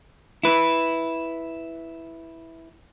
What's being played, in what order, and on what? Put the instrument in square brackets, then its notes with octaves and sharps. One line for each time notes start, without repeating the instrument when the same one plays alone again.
[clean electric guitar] E4 B4